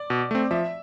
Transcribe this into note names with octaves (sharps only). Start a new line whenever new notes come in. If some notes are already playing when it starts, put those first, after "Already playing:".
Already playing: D5
B2
A3 C4
F3 E5